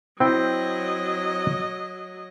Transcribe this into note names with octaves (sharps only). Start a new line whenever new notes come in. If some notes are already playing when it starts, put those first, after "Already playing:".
F#3 C4 E4 D#5 G5